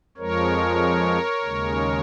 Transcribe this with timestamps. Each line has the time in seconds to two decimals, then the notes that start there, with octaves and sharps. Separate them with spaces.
0.17 F2 F3 G#3 A#4 C#5
1.43 D#2 C#3 G#3